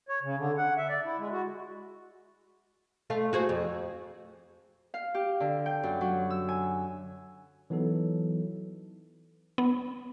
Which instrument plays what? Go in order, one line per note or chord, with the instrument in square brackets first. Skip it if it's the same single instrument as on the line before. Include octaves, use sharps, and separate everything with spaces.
[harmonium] C#5
C#3
D3
F#5
E5
D5
E4
G#3
F#4
[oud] A3 F4 F5
F#4 G#4 C5
F2
[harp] F5
G4
D3
G5
F#2
F#3
E6
G#5
[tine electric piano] E3 F#3 B3 D#4 A4
[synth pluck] B3